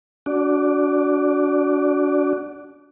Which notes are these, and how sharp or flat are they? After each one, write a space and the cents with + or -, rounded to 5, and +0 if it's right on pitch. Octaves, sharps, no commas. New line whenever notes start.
D4 -30 F#4 +0 D5 +0